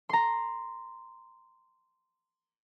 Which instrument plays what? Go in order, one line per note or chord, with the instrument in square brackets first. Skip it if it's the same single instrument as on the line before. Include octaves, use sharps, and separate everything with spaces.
[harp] A#5 C6